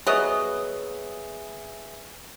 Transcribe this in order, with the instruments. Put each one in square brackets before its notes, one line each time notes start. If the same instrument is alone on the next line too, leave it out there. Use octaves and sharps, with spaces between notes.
[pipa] F#3 B3 D#5 [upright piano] G#4 B4 E5